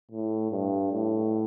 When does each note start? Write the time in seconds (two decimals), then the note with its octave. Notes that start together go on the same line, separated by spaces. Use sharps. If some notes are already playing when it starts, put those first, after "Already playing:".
0.11 A2
0.51 G2
0.92 A2